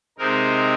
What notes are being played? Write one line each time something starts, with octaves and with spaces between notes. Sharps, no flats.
C3 G#3 C4 D#4 A#4